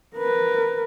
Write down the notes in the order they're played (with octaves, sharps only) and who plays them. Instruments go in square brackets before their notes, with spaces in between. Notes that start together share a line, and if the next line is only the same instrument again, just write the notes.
[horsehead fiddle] A#4 B4